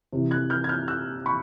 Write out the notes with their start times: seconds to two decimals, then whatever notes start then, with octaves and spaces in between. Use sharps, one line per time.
0.13 C3 E3
0.31 F#6 G#6
0.50 F6 G6
0.64 G#6
0.69 F6 G6
0.88 E6 F#6
1.26 B5 C#6